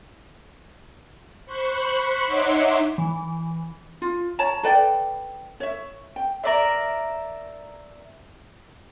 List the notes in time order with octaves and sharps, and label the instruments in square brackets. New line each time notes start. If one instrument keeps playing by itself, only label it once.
[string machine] C5 B5 C#6 F#6 B6
D#4 C#5 E5 F#5 C6 D6
[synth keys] E3
[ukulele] F4
C#5 A5 A#5
A4 B4 D5 G5
C#5 E5
G5
[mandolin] A#4 D5 E5